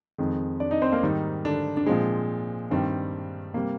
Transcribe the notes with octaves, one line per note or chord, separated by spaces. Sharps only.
F2 D#3 G#3
D4 D5
D#4 D#5
C4 C5
A#3 A#4
G#2 D#3 G3 D#4
D3 D4
D4
A#2 F3 G#3 C4
G2 D#3 G3 C4
C3 G3 A#3